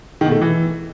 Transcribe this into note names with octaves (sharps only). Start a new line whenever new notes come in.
D#3
B2
A3
D#3
E3